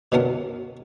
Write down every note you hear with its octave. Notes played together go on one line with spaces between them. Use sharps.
B2 D3 B3 C#4 A#4 F#5